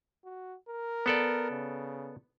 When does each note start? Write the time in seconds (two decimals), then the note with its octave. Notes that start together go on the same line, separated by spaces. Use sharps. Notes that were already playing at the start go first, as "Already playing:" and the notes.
0.24 F#4
0.69 A#4
1.06 B3 A4 D5
1.51 C#3